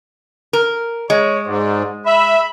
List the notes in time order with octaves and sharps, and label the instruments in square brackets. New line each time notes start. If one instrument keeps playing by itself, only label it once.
[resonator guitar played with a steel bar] A#4
[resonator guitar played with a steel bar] G#3 [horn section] C#5
[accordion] G#2 [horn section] F#4 C5 D5
[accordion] E5 [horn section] B5